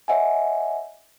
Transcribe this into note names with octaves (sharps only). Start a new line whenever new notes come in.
C#5 D#5 E5 F#5 G#5